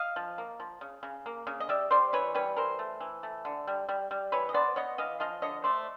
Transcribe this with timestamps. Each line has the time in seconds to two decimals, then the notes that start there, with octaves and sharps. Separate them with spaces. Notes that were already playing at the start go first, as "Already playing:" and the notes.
Already playing: D#5 F5
0.16 F3
0.38 A#3
0.60 F3
0.81 C#3
1.03 C#3
1.26 A#3
1.47 C#3
1.60 D#5
1.69 G3 D5 E5
1.91 G3 C5 D5
2.13 E3 B4 C#5
2.35 G3 B4 C#5
2.56 E3 A#4 C5
2.79 A3
3.00 E3
3.23 A3
3.45 D3
3.67 G3
3.89 G3
4.11 G3
4.32 E3 B4 C#5
4.49 D#5
4.54 B3 C5 D5
4.76 B3 C#5 D#5
4.98 E3 D#5 F5
5.20 F3 D#5 F5
5.42 D3 C#5 D#5
5.64 A3 C5 D5